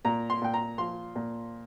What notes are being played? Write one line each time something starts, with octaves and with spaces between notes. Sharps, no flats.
A#2 A#5
C6
A#2 G5
A#5
F3 C6
A#2